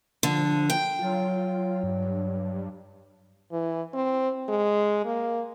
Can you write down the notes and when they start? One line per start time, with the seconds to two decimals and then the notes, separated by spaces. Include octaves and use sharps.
0.23 D3 F3
0.70 G5
0.99 F#3 F4
1.83 G2
3.52 E3
3.94 C4
4.49 G#3
5.05 A#3